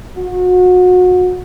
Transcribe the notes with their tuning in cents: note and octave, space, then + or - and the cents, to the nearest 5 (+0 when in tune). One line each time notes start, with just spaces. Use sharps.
F#4 -30